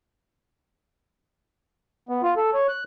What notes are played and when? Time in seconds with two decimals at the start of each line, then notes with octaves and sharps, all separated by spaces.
2.09 B3
2.23 F4
2.36 A4
2.54 C#5
2.68 F#6